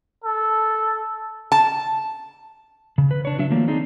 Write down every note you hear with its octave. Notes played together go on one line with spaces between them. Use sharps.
A4
A5
C#3
B4
D4 C#5
F#3 D4 E5
D#3 F3 A3 A#3
C4 D4 D#4 G#4